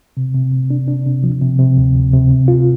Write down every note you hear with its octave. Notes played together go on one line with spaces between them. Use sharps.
C3
C3
C3
D4
D4
C3
F3
C3
C3
D2
D2
C3
C3
F4